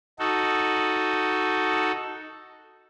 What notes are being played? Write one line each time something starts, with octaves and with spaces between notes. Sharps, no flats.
D#4 F#4 A4